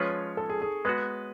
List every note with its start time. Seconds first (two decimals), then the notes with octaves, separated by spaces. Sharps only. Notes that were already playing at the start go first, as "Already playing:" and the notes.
Already playing: F3 G#3 C#4 F4 B4 C#5
0.37 A4
0.50 G#4
0.62 G#4
0.85 G#3 B3 F#4 B4